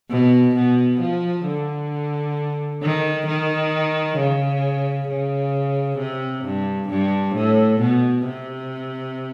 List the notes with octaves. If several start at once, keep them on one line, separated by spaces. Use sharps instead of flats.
B2
B2
F3
D3
D#3
D#3
C#3
C#3
C3
G2
G2
A2
B2
C3